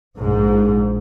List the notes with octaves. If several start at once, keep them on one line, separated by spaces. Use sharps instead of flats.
A#1 G#2